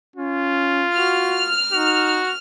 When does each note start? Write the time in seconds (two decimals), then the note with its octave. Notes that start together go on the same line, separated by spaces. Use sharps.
0.16 C#4 F4
0.94 F#4 F6
1.72 D#4 F#4